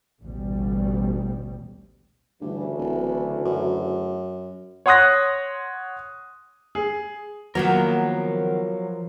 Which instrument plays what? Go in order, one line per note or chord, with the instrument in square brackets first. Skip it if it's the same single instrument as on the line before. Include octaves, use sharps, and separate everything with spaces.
[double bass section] A1 D2 B2 G3
[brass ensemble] D2 C#3 E3 [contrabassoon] G2
[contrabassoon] D1
F#2
[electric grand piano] C#5 F#5 C6 D#6 F#6 A#6
[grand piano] G#4
[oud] D#3 A#3 B3 [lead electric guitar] F3 A#4 [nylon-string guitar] F#3